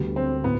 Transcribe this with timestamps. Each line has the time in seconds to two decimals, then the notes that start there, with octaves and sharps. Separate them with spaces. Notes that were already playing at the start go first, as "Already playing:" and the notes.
Already playing: D2 D3 G3 B3 F#4
0.16 C4
0.44 A2 B3